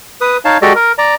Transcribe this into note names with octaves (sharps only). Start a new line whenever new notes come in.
B4 D#6
D#4 C#5 F5 A5
G#3 F#4 G4 A4 D5 D#5
A#4
D5 A#5